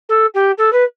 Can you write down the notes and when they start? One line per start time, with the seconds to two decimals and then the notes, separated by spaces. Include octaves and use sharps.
0.09 A4
0.34 G4
0.58 A4
0.72 B4